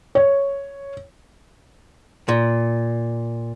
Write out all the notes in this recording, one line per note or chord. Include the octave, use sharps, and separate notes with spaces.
C#5
A#2